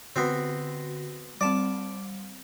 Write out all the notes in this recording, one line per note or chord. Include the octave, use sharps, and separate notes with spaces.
D3 B3 C4 F#4 A#6
G3 C4 D5 A5